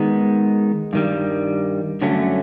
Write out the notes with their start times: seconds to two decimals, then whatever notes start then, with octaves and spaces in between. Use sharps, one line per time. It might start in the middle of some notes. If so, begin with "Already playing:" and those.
Already playing: D#3 G#3 B3 D#4
0.93 G2 D#3 G3
2.02 G2 D3 F#3 A3 C#4